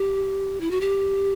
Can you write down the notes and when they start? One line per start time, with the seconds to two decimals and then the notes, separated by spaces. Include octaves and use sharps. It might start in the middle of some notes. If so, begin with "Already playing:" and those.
Already playing: G4
0.60 E4
0.71 F#4
0.81 G4